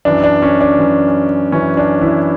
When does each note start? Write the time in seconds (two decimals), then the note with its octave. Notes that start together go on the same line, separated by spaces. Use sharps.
0.05 F#2 E3 D4
0.24 D4
0.42 C#4
0.61 D4
0.79 F#2 E3
1.52 F#2 E3 C#4
1.77 D4
2.01 E3 E4